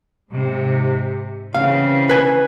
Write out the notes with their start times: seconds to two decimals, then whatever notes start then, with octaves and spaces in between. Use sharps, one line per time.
0.30 G#2 C3
1.54 C#3 E3 C4 F5
2.09 B4 G#5